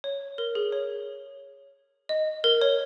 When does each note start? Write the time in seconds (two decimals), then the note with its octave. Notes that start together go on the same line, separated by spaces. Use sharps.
0.04 C#5
0.38 A#4
0.55 G#4
0.72 C#5
2.09 D#5
2.44 A#4
2.61 C#5